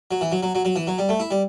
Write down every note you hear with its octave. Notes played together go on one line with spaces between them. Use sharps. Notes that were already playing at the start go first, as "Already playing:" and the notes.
F#3
E3
F#3
F#3
F#3
F#3
E3
F#3
G3
A3
E4
G3